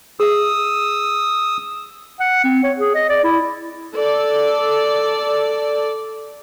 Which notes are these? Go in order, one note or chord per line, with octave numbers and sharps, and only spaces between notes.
G#4 E5 D#6 E6
F#5
C4
C#5
G#4
D#5
D5
E4
A4 D5